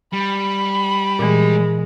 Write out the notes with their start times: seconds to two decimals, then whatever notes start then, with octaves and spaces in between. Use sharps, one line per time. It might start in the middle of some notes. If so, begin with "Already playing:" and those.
0.13 G3 B5
1.19 A#2 E3 G#3